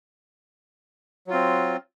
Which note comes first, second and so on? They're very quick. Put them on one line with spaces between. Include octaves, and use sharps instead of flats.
F#3 F4 C4